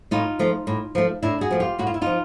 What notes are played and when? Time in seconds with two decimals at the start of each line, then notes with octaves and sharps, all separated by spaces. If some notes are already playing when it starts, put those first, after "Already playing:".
0.11 A2 D#4 F4
0.39 F3 A3
0.67 A2
0.95 F3 A3
1.23 A2 D4 E4
1.41 F#4 G#4
1.51 F3 A3
1.60 F4 G4
1.79 A2 F#4
1.87 F4
1.94 E4
2.01 F3 D#4 F4